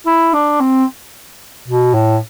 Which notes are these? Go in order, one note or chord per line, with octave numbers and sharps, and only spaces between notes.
E4
D4
C4
B2
A2